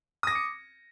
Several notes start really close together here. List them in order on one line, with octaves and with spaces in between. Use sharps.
D#6 A#6 D6 C#7